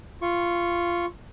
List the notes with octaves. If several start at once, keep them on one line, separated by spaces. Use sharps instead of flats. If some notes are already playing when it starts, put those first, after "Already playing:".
F4 C#6